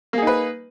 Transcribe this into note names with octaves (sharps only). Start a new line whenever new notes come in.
A#3 D#4 G#4 B4